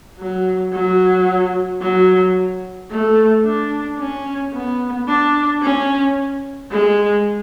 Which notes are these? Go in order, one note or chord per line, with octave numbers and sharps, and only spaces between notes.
F#3
F#3
F#3
A3
D4
C#4
B3
D4
C#4
G#3